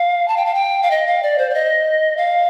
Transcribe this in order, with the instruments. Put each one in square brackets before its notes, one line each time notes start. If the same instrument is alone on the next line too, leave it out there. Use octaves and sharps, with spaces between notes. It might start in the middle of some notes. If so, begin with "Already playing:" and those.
Already playing: [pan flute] F5
A5
G5
F5
G5
F5
D#5
F5
D5
C5
D5
D#5
F5